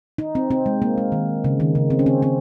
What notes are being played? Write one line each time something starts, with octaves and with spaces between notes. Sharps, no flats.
D#4
C4
C4
G#3
A#3
G#3
D#3
C#3
D#3
C#3
C4
C#4
C4
C4